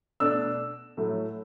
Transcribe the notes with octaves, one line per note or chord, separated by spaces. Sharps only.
B2 A3 D4 E6
A2 F#3 A3